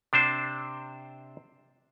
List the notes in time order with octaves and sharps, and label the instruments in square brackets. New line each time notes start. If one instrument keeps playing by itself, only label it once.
[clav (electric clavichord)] C3 D4 C5